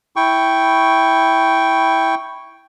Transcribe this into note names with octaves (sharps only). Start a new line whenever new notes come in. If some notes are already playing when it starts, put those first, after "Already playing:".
E4 G5 C#6